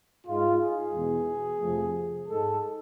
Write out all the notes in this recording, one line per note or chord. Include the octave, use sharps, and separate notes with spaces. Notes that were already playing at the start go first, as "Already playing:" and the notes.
G#2 G#3 F4
G#4
E2 B2 G#3
F2 C3 F3 A3
G#2 G#3 A4